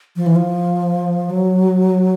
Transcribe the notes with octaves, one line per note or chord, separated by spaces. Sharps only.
F3
E3
F3
F#3